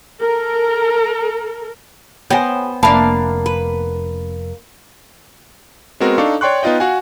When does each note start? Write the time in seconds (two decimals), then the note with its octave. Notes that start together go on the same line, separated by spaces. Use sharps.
0.21 A4 A#4
2.30 B3 G4 C5 C#5 E5 G#5
2.83 F1 A#3 D4 E5 F5 A5 B5
3.46 B4
6.00 G#3 B3 C4 F#4 A#4
6.18 D4 D#4 A4 F5 C#6 D6
6.41 C#5 D5 G5 C6 C#6 F#6
6.63 B3 D#4 F4 D#5 G5
6.80 F#4 F5 F#5 G#5